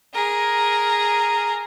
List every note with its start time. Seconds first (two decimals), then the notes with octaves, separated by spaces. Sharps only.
0.14 G#4 A#4